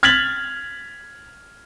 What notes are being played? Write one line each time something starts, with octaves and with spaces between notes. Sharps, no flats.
F6 G#6 A6 B6 F7 F#7